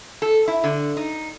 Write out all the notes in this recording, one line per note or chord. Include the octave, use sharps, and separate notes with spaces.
A4
E4
D3
D#4